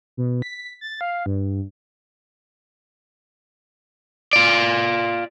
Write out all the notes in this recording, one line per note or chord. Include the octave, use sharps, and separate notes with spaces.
B2
B6
A6
F5
G2
F4 D5